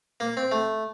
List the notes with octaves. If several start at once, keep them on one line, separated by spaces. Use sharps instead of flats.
A#3
C4
A3